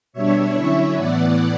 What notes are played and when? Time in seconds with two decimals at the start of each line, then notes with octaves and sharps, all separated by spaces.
0.13 B2 G3 D4 C#5 E5
0.54 D3 F#3 C#4 E4
0.96 A2 E3 B3 D5 F#5